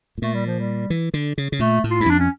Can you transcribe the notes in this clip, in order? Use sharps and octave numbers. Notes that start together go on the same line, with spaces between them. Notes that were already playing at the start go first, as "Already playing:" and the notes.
A2
A#2 A3
G3
F3
G3
E3
D3
C#3
C#3
A#2 A3
A2
F4
G2 E4
F2 D4
C#4